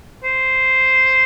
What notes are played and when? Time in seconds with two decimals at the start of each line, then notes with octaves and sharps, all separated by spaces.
0.24 C5